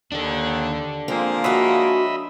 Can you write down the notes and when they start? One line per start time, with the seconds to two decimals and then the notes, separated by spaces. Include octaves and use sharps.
0.12 D#2 D4 A4
1.08 F3 G#3 A#3 C4
1.44 F#4 C#5 D#5 E5 B5